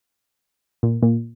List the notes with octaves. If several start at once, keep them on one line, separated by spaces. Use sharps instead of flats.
A#2
A#2